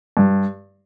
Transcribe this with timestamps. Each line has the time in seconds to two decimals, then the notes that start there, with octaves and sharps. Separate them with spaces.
0.17 G2